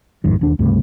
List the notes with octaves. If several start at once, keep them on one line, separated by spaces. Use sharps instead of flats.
A1 F2 G#2 D#3
E1 D#2 D4
C#2 G2 C3 A3